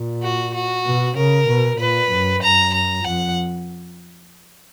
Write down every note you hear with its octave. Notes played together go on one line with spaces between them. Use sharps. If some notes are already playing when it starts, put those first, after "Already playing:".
Already playing: A#2
F#4
F#4
B2
C#3 A#4
B2
A#2 B4
F#2
F#2 A#5
A#5
F2 F#5